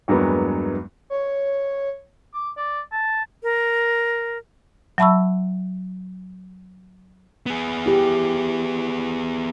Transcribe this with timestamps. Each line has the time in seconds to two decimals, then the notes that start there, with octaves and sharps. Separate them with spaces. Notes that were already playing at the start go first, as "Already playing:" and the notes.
0.08 E2 G2 F#3 G#3 A#3 B3
1.10 C#5
2.34 D6
2.57 D5
2.92 A5
3.43 A#4
4.98 F#3 E5 A5 B5 C#6 E6
7.46 B3 G#4
7.86 E4 G4